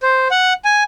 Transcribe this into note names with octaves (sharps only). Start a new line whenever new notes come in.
C5
F#5
G#5